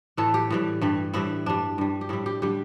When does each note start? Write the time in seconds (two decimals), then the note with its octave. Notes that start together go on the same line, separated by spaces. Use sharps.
0.17 A2 E3 A3 A4
0.34 G4
0.50 A2 E3 G3
0.81 G2 E3 G3
1.14 A2 E3 G3 E4
1.46 G2 G3 D4
1.78 G2 G3
2.01 G4
2.09 A2 G3 E4
2.26 G4
2.42 D3 G3 G4